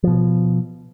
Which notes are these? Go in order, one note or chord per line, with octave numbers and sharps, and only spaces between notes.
B2 F3